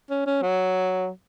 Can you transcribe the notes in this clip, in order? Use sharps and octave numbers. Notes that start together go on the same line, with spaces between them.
C#4
C#4
F#3